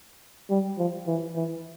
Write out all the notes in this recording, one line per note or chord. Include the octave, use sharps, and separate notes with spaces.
G3
F3
E3
E3